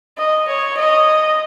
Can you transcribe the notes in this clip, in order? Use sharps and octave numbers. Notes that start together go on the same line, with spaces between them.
D#5
C#5
D#5